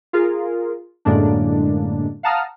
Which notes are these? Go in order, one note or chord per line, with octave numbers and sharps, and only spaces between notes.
F4 G#4 A#4
F#2 A2 D3 G#3 A#3 D4
F5 F#5 A5 A#5 D#6 F6